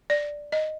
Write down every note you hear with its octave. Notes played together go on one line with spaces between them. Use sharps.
D5
D#5